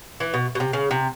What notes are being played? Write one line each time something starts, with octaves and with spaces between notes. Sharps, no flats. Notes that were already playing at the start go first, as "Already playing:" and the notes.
E3
B2
B2
C3
C#3
C3